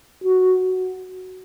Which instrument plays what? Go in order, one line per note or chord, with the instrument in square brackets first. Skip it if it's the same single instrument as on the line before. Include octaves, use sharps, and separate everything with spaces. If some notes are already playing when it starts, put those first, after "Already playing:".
[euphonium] F#4